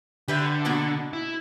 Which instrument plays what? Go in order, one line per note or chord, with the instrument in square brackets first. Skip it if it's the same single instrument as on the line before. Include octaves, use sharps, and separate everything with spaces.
[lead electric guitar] D3 [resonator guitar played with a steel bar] G4 B4 E5
[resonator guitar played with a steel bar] B2 A#3 F#4
[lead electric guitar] E4